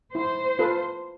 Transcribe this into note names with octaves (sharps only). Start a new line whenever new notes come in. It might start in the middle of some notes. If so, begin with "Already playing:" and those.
E4 C5
F4 A4 B4